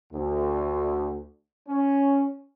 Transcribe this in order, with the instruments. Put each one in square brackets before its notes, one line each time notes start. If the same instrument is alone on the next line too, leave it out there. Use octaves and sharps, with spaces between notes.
[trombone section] D2
C#4